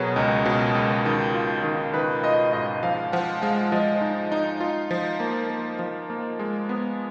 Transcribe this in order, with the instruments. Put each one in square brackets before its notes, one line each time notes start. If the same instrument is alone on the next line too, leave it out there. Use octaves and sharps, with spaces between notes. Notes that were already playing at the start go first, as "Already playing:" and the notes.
Already playing: [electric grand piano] B2 F#3 B3 [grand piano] G#4 A#4 B4 C#5
[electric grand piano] C#2 [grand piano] D#5
[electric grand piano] B2
C#2
D#3
F4
D#3
[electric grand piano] D#3 [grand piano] B4
[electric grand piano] F4 [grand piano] D#5
[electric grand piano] G#2 [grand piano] D#5
[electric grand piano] F3 [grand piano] F5
[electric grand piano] F3 [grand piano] F#5
[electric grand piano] G#3 [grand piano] F5
[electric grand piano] F3 [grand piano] D#5
[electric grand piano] D#4
D#4
F4
F3
A#3
A#3
F3
A#3
G#3
B3